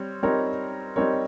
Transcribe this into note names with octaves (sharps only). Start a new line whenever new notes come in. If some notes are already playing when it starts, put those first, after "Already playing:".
Already playing: G3 C4 C#5
G3 C4 D#4 A#4 C#5
G3 C4 D#4 A#4 C#5